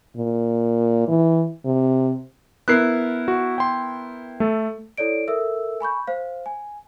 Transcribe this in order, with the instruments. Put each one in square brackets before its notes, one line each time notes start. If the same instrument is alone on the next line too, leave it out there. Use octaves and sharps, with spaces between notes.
[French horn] A#2
E3
C3
[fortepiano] B3 E4 A#4 [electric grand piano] F#6 C7
[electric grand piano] F#4
G5 C6
A3 A4
[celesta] E4 A4 C#5 D5 D7
A4 A#4 E5 E6
G#5 B5 C#6 G6
C5 F5
G#5